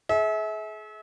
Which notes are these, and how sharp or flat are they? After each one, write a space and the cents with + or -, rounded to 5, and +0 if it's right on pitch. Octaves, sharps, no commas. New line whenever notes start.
G#4 +40 E5 -30